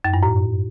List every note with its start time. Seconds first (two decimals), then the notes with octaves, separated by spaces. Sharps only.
0.04 F#2
0.14 G2
0.23 A2